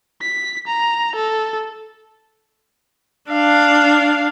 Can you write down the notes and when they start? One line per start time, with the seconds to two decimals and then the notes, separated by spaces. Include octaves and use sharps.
0.22 B6
0.67 A#5
1.15 A4
3.31 D4 F5